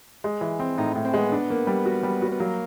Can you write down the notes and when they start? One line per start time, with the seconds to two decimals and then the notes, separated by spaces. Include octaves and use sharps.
0.24 G#3
0.41 E3
0.60 C4
0.78 A2 D#4
0.96 A2
1.05 C4
1.14 G#3 B3
1.32 D4
1.50 A#3
1.67 G3
1.86 F#4
2.03 G3
2.22 F#4
2.32 B3
2.40 F#3 A#3